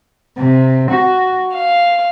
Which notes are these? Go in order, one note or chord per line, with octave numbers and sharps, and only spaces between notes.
C3
F#4
F5